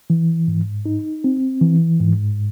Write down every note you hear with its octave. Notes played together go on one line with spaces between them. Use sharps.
E3
G#2
D#4
C4
E3
G#2